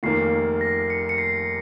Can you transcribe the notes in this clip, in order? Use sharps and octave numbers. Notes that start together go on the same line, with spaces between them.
F1 D#2 D#3 A#3 C7
A#6
C#7
C#7
C7